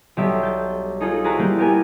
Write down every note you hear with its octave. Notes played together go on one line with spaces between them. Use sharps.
B1 G3 G4 A4 E5
G6 A6
D#4 F4 G#4 A4
E4 F#4 G#4 C5 A5 A#5
G3 A#3 G6
B3 G4 A#4 G#5